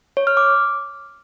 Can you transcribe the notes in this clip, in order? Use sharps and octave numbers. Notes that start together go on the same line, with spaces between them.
C#5
F6
D6